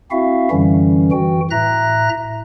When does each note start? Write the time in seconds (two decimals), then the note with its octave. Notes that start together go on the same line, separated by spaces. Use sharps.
0.11 C4 E4 F#4 E5 F5
0.51 F#2 D3 E3 G3 C#4
1.12 E3 F#4 G5
1.51 A2 E5 A#5 F#6 A#6